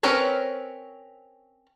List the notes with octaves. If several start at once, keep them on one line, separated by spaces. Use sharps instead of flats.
C4 C#4 A#4 B4 C#5